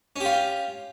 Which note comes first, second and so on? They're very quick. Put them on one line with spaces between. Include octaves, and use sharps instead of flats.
C#4 G4 F4